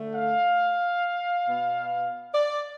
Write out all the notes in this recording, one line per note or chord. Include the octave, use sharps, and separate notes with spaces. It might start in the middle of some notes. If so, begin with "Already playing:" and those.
Already playing: D3 A3
F5
B2 B3
D5